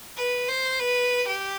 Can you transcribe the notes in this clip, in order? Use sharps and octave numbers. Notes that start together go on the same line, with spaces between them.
B4
C5
B4
G4